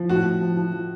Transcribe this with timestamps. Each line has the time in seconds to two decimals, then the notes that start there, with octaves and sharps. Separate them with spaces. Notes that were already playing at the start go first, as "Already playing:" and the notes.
Already playing: F3
0.09 A2 F#4
0.25 A2
0.41 F3
0.57 F3
0.73 F3